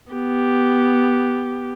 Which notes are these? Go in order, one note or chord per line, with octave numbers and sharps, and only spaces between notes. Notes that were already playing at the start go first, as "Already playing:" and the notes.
B3 G4